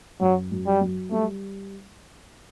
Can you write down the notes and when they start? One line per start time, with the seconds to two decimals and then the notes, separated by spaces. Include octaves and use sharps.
0.21 F#2 F#3
0.52 F#2
0.66 G3
0.81 F#3
1.11 G3 A3